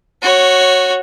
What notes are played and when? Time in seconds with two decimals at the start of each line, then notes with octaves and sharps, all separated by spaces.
0.22 F#4 C#5